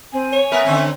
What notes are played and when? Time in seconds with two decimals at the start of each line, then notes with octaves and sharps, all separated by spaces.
0.13 C4 G#5
0.33 C#5
0.52 B3 A#4 B4 E5
0.65 D3 C4 C#4